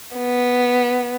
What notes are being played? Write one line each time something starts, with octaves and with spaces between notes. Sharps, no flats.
B3